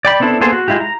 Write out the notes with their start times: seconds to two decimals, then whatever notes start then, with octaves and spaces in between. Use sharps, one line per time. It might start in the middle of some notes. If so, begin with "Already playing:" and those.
0.05 D5 G5 B5
0.20 B3 C4 D4 E4 A4
0.41 A#3 B3 G#4 A4 C5
0.52 F#4
0.68 G#3 E4 F4 G4
0.80 A#5